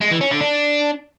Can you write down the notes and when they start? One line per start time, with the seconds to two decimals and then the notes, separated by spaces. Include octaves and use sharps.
0.01 G#3
0.11 E3
0.21 C#4
0.31 D3
0.41 D4